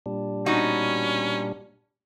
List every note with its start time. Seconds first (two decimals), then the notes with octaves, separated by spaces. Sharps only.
0.06 A#2 G3 D4
0.46 B2 C#4 D#4 F#4